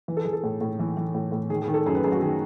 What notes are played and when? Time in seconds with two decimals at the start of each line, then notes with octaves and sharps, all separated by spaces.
0.08 E3 B4
0.17 A4
0.25 E3 G#4
0.33 A4
0.43 A2
0.61 A2
0.79 E3
0.97 E3
1.14 A2
1.32 A2
1.50 D#3 G#4
1.62 G#4
1.68 D#3
1.74 A4
1.86 F#2 G#4
1.95 B4
2.04 F#2 G#4
2.12 F#4
2.22 D#3 G#4